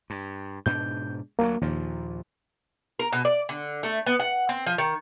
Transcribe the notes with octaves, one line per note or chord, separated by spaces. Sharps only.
G2
G#2 B2 D4 G6
D2 E3 F#3 A#3
D#2 A#2 F3
A#4
B2
D5
D3
A3
B3
F#5
C4
F3
D#3